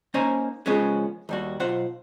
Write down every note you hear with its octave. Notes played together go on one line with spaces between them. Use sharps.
A#3 C#4 D#4 C5 G#5 A#5
C#3 F3 G#3 B3 C#4
D#2 G3 F#4
B1 F4 C5 F#5